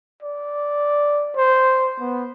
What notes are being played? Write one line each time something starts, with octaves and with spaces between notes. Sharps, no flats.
D5
C5
B3